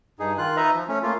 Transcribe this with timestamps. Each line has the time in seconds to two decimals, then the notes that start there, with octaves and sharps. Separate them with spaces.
0.19 G2 D#4 G#4
0.38 D#3 F4 F#6
0.57 D#4 B4 D#5 E5 A#5
0.74 F3
0.88 A3 C#4
1.03 A3 A#3 F4